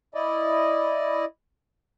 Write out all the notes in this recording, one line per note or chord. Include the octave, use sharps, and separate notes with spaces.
E4 D5 D#5